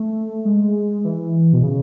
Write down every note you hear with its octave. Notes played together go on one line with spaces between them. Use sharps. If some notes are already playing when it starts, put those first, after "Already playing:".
Already playing: A3
G#3
E3
B2
C#3